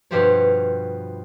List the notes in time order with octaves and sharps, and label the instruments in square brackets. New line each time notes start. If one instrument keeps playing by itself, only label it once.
[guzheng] G2 B2 F3 G4 C5 C#5